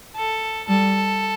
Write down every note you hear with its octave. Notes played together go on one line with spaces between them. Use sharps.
A4
G3 A4